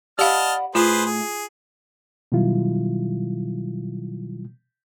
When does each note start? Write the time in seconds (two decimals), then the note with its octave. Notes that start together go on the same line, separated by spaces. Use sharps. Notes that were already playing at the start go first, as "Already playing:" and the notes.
0.19 G4 D5 D#5 F5 F#5 A5 B5 F6
0.75 A2 F4 G#4 B4 C5
1.06 G#4
2.32 B2 D#3 F#3 G3 E4 F4